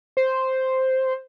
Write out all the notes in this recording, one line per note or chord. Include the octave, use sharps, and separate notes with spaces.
C5